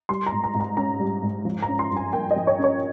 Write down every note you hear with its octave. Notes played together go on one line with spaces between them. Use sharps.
G3 C6
A#5
G#2
A#5
G#2
A#5
C#4 A#5
G3
G#2
F3
A#5
C#4
C6
G2
G#5
A#3 G5
D#5
F3
C#5
C#4
C#5